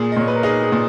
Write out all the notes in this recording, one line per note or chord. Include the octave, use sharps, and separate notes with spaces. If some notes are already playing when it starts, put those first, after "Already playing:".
Already playing: A#2 G#4
D#5
A#2 C#5
B4
A#4
D#4 G#4
G#4
A#2